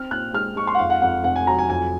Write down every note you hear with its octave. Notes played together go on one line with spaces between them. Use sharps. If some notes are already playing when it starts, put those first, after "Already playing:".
Already playing: C4 F6
A#2 F#6
G#3 F6
G#3 C#6
C6
F#5
F2 F5
F#5
F2 F#5
F1 F#5
G#5
F#3 A#5
G#5
F2 G#5